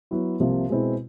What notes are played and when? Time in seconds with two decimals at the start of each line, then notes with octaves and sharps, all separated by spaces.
0.11 F#3 B3 E4
0.40 C2 C3 F3 A#3
0.69 B2 G#3 C4 E4